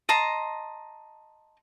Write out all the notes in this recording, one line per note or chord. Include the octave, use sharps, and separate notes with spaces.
D#5 A5 A#5 C6